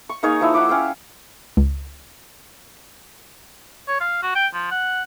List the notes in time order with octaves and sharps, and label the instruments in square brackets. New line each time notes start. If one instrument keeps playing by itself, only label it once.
[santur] C#6
A#3 D#4 G#4 C#5
F3 E4 E6
F#5 B5 D6
C#4 F5 G5
[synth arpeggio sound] C#2
[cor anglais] C#5
F5
F#4
G5
F3
F#5